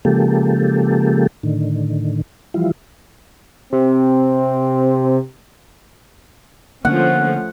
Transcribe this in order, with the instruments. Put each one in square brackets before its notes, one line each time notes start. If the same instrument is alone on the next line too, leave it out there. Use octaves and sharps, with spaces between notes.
[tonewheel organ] C#3 F3 G#3 A#3 G4 A4
A2 D3 D#3
E3 F3 G3 E4 F4
[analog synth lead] C3 [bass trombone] C4
[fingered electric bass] D3 A#3 [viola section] F3 A3 C#4 [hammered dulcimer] F#5